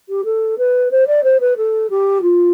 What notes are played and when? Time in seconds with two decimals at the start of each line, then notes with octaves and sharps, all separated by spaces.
0.09 G4
0.25 A4
0.58 B4
0.91 C5
1.07 D5
1.24 C5
1.40 B4
1.57 A4
1.90 G4
2.22 F4